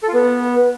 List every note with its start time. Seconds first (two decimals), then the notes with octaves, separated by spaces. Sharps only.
0.03 A4
0.08 F4
0.14 B3